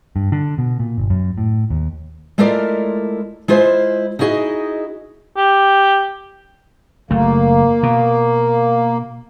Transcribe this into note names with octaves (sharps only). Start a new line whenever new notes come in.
G2
D3
B2
A#2
G1
F#2
A2
D#2
G#3 A3 E4 F4 A#4 D5
G#3 E4 F4 C5
D#4 E4 F#4 G#4 D5 D#5
G4
F#1 A3 A#3
B2